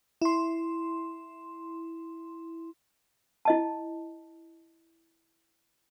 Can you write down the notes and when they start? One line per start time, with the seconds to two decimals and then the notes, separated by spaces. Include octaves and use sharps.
0.22 E4 C6
3.45 E4 D#5 A5